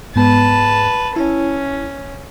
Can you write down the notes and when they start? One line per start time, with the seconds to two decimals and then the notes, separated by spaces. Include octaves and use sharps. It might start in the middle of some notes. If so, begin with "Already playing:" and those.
0.16 G#2 B3 B4 A5
1.16 C#4 E4